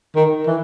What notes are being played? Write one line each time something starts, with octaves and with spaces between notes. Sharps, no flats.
D#3
E3